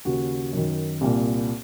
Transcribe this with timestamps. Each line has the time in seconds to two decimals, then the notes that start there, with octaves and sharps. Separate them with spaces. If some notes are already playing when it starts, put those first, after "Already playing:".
0.05 D#2 C#3 F#4
0.53 F#2 D#3
1.01 C2 A#2